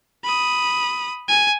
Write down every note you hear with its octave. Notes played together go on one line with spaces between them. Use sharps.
B5 D#6
G#5